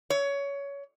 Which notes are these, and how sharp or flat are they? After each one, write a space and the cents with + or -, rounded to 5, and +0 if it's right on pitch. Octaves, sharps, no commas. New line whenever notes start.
C#5 +20